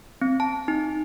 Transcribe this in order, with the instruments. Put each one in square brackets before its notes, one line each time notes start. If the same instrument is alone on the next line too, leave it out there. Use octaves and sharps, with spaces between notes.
[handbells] C4
A5
D#4